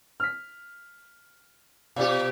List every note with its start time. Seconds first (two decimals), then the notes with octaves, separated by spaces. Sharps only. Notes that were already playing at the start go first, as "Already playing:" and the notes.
0.20 F6 B6
1.96 B2 F4 G4 D5 F5